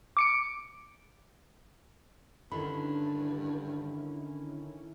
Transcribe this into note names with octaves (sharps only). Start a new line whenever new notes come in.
D6 C#7 D7
G2 D3 D#3 C#4 E4 B5